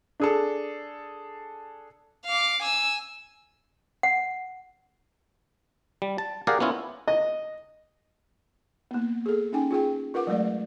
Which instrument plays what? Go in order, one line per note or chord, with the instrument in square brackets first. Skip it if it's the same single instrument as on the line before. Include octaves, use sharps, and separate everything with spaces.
[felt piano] D4 G#4 A4
[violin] F5 D6
G#5 E6
[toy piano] F#5
[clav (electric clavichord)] G3
A5
G4 G#4 A#4 D5 F5 F#5
B3 C#4 E4 F4
[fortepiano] D#5
[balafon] A#3 B3
G#4 A4
C#4 D#4 G5 G#5
F4 G#4 G5
F4 A#4 B4 F#5 D6
F#3 G#3 A3 D5